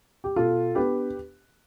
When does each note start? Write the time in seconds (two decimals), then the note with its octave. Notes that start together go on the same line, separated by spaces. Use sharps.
0.24 G4
0.36 B2 F4 A4
0.75 B3 D4 G4 B4